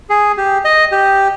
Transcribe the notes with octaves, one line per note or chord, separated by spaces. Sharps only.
G#4
G4
D#5
G4